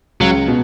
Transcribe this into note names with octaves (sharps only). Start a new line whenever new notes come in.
C#2 F#3
B2